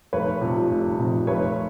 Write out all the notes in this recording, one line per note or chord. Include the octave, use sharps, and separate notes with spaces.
F1 B4 C#5
F2 C3 F3
F1
F2 C3 F3
F1 B4 C#5